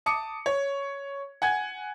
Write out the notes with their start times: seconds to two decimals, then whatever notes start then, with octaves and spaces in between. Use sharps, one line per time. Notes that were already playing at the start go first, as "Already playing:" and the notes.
0.06 A5 D6 D#6 C#7
0.46 C#5
1.42 F#5 G#5 G#6